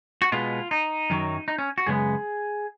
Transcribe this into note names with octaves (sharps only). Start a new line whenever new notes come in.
F#4
B2 G#3 B3 F4
D#4
F#2 D#3 F#3
D#4
C#4
F#4
F#2 C#3 G#3 B3 G#4